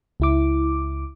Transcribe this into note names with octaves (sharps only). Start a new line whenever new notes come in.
C#2 E4 D6